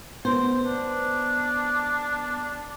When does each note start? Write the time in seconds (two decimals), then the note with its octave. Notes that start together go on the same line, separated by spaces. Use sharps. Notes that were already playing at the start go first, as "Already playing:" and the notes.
0.25 B3 C5
0.66 D4